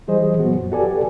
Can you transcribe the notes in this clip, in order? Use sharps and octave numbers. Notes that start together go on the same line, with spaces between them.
E3 G3 G#4 C5 D#5
A#2 F#3 B3 F#4
F#2
F#4 G4 A4 B4 D5 G#5